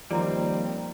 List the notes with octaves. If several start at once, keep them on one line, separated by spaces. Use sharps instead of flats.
D#2 F3 G3 C4 F4 C5 D5 A#5